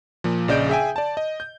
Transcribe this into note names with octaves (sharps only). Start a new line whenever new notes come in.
A#2 F3
A#1 C#3 D5 D#5 G6 D7
G#4 E5 G5 G#5
D5 A5
D#5
G6